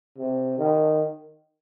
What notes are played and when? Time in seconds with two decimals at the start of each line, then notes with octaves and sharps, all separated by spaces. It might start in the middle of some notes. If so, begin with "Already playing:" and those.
0.18 C3
0.58 D#3